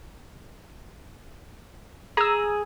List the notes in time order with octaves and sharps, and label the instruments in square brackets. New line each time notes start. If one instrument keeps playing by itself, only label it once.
[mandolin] G#4 [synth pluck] A#5 E6